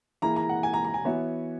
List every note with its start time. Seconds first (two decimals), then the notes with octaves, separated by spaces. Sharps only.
0.22 E3 A#3 E4 G#4 A#5
0.36 A#5
0.49 F#5
0.63 G#5
0.73 A#5
0.84 A#5
0.94 G#5
1.05 E3 B3 F#4 C#5 E5